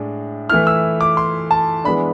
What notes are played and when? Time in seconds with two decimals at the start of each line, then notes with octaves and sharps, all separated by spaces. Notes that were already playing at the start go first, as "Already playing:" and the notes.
Already playing: A2 G#3 D4
0.49 E3 A3 E4 F6
0.67 E6
1.01 D6
1.17 C6
1.51 A5
1.84 E3 G#3 B3 D4 B5